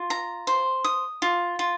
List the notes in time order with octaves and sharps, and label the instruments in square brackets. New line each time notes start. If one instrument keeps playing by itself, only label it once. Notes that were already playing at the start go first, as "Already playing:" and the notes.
Already playing: [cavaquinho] F4
A#5
C5
D#6
F4
F4